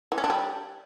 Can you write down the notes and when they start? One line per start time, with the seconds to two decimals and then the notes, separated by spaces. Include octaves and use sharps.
0.12 E3
0.18 C#4
0.24 D4
0.30 G3